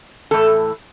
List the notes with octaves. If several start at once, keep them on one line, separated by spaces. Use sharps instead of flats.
A2 E3 A4